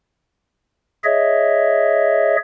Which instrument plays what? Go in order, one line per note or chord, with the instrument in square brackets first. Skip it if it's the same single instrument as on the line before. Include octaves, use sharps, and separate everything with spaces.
[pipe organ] G#4 C#5 D#5 E5